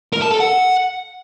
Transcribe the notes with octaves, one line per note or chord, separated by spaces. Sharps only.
A#4
A5
A4
F#5